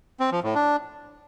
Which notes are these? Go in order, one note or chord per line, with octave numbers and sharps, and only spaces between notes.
C4
F3
A2
D4